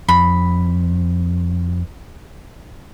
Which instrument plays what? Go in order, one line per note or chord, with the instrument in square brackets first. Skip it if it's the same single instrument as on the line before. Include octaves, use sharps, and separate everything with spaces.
[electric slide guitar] F2 [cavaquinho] B5